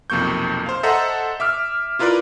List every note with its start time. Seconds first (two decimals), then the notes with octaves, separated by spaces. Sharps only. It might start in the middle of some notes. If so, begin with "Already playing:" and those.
0.10 B1 F2 C3 A#3 C#6 G6
0.66 C5 F5
0.83 A4 C5 D#5 E5 F#5 A#5
1.40 E5 D6 F6
1.99 E4 F4 A#4 B4 D5